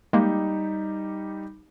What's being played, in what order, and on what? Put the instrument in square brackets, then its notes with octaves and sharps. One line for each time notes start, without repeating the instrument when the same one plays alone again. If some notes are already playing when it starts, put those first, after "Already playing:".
[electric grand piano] G3 D#4 G4 [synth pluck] G#3 A#3